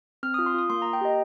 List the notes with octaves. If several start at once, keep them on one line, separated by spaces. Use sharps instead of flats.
C4 F6
F4 D#6
C6
F4 D#6
A#3 C6
A#3 A#5
G5
G4 D#5